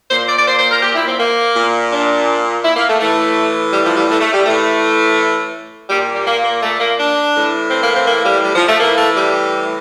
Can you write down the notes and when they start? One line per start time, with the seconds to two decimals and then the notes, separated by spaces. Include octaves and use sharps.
0.10 A#2 C5
0.28 D5
0.38 D5
0.47 C5
0.59 C5
0.71 A#4
0.83 G4
0.95 E4
1.07 C4
1.19 A#3
1.56 A#2
1.92 D4
2.65 E4
2.76 A#3
2.89 A3
3.01 A2 E3 A3
3.73 G3
3.85 F3
3.97 G3
4.09 A3
4.21 A3
4.33 G3
4.45 A2 E3 A3
5.90 A#2 G3
6.14 G3
6.26 A#3
6.44 A#3
6.63 A3
6.80 A#3
6.99 D4
7.35 A2 E3
7.71 C4
7.83 A#3
7.95 C4
8.07 A#3
8.26 G3
8.44 G3
8.55 F3
8.68 A3
8.80 A2 E3 A#3
8.97 A3
9.16 G3